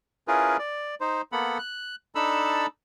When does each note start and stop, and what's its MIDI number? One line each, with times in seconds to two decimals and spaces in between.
0.28 0.57 61
0.28 0.57 64
0.28 0.57 65
0.28 0.57 68
0.28 0.57 70
0.28 0.57 71
0.59 0.95 74
1.01 1.22 63
1.01 1.22 72
1.32 1.58 58
1.32 1.58 59
1.32 1.58 69
1.32 1.58 78
1.32 1.58 83
1.59 1.96 90
2.15 2.66 62
2.15 2.66 63
2.15 2.66 69
2.15 2.66 81
2.15 2.66 83
2.15 2.66 88